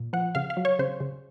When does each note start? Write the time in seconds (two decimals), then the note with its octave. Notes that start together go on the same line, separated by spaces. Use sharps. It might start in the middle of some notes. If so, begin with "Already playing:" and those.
Already playing: A#2
0.13 F3 F#5
0.35 C#3 F5
0.50 F5
0.57 F#3
0.65 C#5
0.79 C#3 C5
1.00 C#3